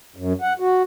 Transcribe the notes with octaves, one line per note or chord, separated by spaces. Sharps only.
F#2
F#5
F#4